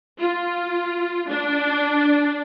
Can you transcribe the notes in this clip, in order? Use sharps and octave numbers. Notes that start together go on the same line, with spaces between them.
F4
D4